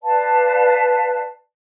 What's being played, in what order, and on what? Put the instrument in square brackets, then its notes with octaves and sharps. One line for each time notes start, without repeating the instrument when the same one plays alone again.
[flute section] B4 D5 F5 A5